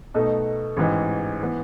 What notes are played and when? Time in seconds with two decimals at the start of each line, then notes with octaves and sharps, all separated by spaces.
0.14 B2 A3 D#4 A4
0.77 A1 G#2 E3
1.42 E3 B3